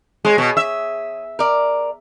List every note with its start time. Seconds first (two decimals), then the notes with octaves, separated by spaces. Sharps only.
0.25 G#3 G#4 C#5
0.38 B2
0.57 E5
1.39 A#4 D5